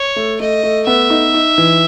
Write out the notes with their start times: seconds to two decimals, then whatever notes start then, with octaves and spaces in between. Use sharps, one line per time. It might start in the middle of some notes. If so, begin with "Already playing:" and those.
Already playing: C#5
0.16 A3
0.40 A3 D#5
0.63 A3
0.87 B3 E5
1.10 D#4
1.34 D#4
1.58 E3